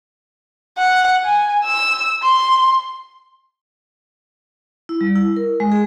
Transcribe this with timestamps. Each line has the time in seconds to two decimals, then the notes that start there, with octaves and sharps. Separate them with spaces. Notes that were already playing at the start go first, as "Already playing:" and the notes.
0.78 F#5
1.25 G#5
1.64 E6
2.23 C6
4.89 E4
5.01 G3
5.16 E4
5.36 A#4
5.60 G#3
5.72 G#4